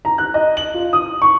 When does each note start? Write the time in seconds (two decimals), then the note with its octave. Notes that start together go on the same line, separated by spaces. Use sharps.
0.05 A#5
0.18 F#6
0.34 D#5
0.57 F#7
0.74 F4
0.93 D#6
1.22 C#6